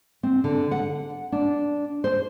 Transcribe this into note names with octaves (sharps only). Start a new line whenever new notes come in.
C4
D3
F#5
D4
C5